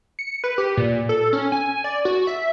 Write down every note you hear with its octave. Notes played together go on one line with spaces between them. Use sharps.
C#7
B4
G4
A#2
A4
C#4
G#5
D5
F#4
E5